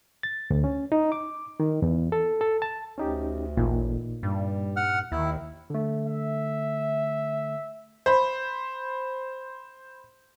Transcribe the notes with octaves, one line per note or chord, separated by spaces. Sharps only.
A6
D2
C#4
D#4
D6
D#3
E2
A4
A4
A5
D2 C#4 D#4 G4
A1 A#2 D#4
G2 G3
F#5 F6
D#2 D#3 E4
D3 A3
E5
C5 B5